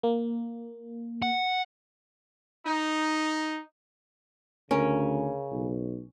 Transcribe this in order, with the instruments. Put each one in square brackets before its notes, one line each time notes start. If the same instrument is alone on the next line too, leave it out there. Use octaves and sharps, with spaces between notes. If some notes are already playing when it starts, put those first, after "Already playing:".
[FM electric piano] A#3
[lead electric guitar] F#5
[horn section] D#4
[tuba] D2 [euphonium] C#3 [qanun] C#4 [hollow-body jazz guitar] A#4
[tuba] B1